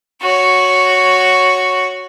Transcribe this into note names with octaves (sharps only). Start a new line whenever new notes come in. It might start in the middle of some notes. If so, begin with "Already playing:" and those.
F#4 C#5